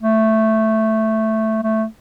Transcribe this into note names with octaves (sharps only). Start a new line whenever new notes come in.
A3
A3